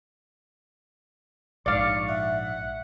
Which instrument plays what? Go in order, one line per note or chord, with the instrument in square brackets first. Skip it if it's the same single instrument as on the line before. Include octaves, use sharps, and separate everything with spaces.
[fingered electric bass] A#1 G#2 [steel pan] D5 F5 [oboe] C#6
[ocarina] E5 [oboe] F#5